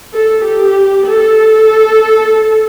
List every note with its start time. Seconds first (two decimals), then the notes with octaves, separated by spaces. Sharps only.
0.14 A4
0.45 G4
1.07 A4